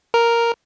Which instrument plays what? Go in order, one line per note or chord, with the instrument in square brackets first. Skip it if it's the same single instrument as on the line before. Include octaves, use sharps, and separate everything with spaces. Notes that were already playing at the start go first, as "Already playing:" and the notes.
[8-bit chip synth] A#4